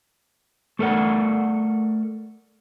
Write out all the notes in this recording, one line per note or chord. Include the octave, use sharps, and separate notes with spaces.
A3 A4 A#4 D5 F#5